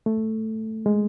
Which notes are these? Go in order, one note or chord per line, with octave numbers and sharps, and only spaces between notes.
A3
G#3